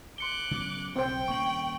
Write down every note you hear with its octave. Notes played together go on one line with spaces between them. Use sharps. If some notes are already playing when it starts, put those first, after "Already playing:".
C6 D6 F#6 C#7 G7
C#3 F#3 B3
B1 C#3 C4 C5 G5
D#1 A#3 C#4 C#6 F#7